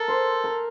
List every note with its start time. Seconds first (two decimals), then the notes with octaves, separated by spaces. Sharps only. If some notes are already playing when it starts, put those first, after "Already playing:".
Already playing: A4 A#4
0.08 C5
0.44 A#4